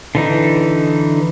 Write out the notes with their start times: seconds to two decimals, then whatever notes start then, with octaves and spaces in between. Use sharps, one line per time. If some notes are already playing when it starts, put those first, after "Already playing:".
0.15 D3 E3 D#4